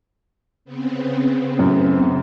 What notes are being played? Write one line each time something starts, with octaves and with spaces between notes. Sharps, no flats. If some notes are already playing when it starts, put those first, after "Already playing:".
C#3 B3 C4
F#2 A2